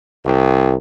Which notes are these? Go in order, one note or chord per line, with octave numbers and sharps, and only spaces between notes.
C2